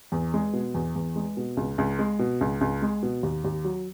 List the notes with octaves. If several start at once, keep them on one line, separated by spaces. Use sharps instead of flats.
E2
G#3
B2
E2
E2
G#3
B2
C#2
C#2
G#3
B2
C#2
C#2
G#3
B2
D#2
D#2
F#3